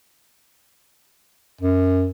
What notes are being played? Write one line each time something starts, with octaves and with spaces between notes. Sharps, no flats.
F#2